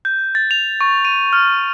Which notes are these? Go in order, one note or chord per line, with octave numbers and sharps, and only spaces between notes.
G6
A6
F7
C#6
D#7
F6